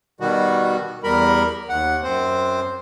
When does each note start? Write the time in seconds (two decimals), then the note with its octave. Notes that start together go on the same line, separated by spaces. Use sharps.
0.20 B2 D#3 G3 F#4
1.04 E2 G3 A#4 B5
1.69 D#2 F#5
2.03 F#2 C4 C5